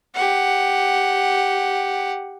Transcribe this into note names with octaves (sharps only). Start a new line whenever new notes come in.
G4 F#5